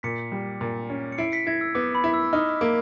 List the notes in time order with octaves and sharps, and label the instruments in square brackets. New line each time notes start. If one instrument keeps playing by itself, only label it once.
[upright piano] A#2 [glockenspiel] B6 C#7
[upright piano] G3
A#2
C#4
[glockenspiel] C#7
[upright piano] E4 [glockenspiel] C7 D7
[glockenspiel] B6 C#7
[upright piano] E4 [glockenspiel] G#6 A#6
[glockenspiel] E6
[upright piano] B3 [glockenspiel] D6
[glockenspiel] B5
[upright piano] E4
[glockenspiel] E6
[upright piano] D#4 [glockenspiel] F6
[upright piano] A#3